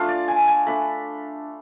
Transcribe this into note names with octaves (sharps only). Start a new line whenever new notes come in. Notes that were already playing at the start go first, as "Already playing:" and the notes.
Already playing: A3 D4 F4 F5
D5
G#5
G#5
A3 D4 B5